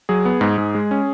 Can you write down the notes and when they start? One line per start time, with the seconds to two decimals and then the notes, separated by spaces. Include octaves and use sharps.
0.09 F#3 G#4
0.25 B3
0.41 G#2
0.58 G#2
0.75 G#3
0.91 C#4